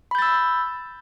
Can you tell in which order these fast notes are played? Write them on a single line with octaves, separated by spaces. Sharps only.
B5 G6 A6 E6